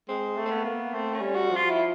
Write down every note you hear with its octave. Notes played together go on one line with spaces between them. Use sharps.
G#3 C4
A3
C4
B3
A#3
A3 C4
C#4
G3
F#4
F3
F4
E4